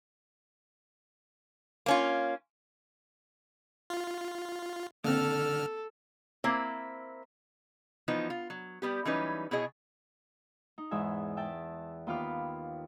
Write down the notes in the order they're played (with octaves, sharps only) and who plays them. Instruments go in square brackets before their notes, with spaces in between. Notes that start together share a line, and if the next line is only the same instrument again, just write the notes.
[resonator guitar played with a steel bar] A#3 C#4 F4
[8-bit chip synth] F4
[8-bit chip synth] D3 F6 [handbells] A#3 C4 [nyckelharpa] A4
[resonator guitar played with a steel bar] A#3 C4 E4
E3 F3 B3 D#4
F4
F#3
G3 B3 G4
E3 F#3 G3 C#4 D#4 B4
B2 E4 F#4 G#4 C#5 D#5
[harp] D#4
E2 G#2 E5 G#5
E5 G5 A5
D#2 B3 F4 B5 D6 F6